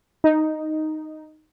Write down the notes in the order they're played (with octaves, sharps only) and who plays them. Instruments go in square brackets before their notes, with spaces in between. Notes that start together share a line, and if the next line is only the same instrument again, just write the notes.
[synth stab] D#4